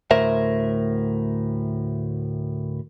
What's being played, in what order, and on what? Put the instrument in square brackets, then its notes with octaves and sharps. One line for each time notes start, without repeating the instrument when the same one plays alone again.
[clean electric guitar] D2 A2 A#4 C5 E5